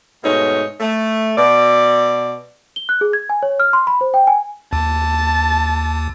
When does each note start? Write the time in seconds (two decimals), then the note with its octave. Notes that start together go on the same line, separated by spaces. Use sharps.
0.24 G#2 B2 A3 D#4 C#5
0.80 A3
1.37 B2 D5
2.76 G7
2.89 F#6
3.01 G#4
3.13 G#6
3.30 G#5
3.43 C#5
3.60 F6
3.73 C6
3.87 B5
4.01 C5
4.14 G5
4.27 G#5
4.73 D#2 A5